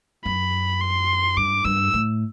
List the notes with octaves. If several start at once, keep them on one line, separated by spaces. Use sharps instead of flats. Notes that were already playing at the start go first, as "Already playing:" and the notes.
F#2 B5
C6
G2 D6
G2 E6
A2